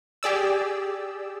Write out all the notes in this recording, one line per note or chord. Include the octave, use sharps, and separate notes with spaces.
G4 G#4 D5 E6